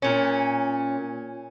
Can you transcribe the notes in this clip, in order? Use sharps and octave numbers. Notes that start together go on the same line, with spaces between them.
A#2 C#4